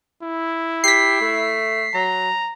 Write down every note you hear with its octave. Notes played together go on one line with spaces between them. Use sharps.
E4
G4 B6 C7
A3
F#3 A#5